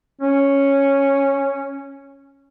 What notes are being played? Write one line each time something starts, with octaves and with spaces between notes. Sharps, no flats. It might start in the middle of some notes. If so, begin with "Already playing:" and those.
C#4